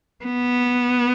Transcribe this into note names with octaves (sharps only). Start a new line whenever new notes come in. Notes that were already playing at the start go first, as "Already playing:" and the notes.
B3